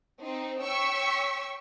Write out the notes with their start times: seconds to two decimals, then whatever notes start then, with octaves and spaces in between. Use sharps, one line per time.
0.22 C4 D#4
0.60 C#5 G5 C#6 E6 B6